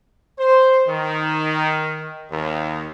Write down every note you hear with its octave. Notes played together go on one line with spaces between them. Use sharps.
C5
D#3
D#2